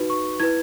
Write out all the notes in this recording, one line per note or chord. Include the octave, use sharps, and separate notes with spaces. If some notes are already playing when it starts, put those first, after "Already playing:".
Already playing: D#4 F#4 B4
C#6
E4 B4 G#6